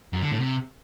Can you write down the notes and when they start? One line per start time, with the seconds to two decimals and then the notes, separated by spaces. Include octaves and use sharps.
0.13 F#2
0.22 D3
0.31 A2
0.40 C3